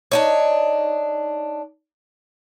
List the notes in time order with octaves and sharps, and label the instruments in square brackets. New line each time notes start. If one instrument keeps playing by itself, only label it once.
[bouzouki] D4 D#4 C#5